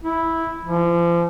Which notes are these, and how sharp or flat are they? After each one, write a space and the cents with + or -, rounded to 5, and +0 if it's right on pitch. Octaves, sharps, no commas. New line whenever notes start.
E4 -10
F3 -35